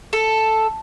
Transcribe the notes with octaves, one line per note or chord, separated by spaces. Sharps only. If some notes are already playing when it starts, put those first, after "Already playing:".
A4